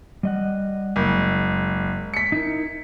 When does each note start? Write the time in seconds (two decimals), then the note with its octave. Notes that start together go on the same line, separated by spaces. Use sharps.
0.23 G3 D#5 F#5
0.96 F#1 G#3
2.14 B6 C#7
2.32 D#4 E4 A#4